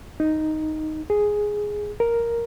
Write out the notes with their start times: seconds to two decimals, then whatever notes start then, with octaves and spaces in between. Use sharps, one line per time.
0.20 D#4
1.10 G#4
2.00 A#4